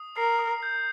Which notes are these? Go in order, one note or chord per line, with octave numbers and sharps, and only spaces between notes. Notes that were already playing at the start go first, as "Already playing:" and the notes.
Already playing: D#6
A#4 C7
D#6
G6